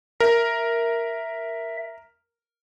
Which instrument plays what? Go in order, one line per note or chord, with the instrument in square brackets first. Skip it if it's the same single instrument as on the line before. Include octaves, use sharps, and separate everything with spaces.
[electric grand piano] A#4 [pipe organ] E5